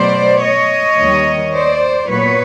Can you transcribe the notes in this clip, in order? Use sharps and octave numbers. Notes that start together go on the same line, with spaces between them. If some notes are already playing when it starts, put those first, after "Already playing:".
Already playing: B2 F#3 A3 C5 D5
C#5 D#5
D#2 D#3 G3
C5 D5
A#2 F#3 B3 B4 C#5